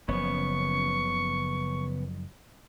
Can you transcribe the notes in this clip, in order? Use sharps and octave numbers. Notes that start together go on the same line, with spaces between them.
F#1 C#3 F3 B3 C#4 C#6